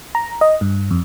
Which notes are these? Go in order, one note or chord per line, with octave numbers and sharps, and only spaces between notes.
A#5
D#5
G2
F2